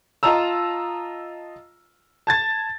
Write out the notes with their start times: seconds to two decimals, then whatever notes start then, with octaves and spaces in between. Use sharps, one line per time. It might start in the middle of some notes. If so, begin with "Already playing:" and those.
0.23 F4 D#5 A5 A#5 E6
2.27 A5 G#6 A6